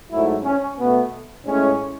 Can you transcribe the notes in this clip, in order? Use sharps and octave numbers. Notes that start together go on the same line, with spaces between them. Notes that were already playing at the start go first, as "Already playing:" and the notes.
G#2 F#3 A3 E4
C#4
B2 A3 B3
A2 G#3 C#4